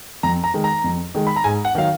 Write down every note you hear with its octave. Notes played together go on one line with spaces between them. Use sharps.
F2 A#5
A#5
D#3 G#3
A#5
F2
D#3 G#3
B5
A#5
G#2 G#5
F#5
D#3 F#3 F5